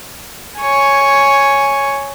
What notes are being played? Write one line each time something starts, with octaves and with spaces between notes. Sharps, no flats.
C#5 G#5